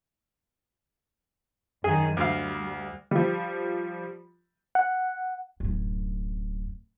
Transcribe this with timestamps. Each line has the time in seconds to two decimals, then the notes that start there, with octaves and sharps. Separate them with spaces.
1.84 F#2 D#3 G#4
2.17 D2 G3 F5
3.11 F3 G3
4.75 F#5
5.60 D1 F#2